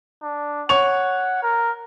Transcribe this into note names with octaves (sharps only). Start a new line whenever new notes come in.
D4
C#5 F#5 C#6 F7
A#4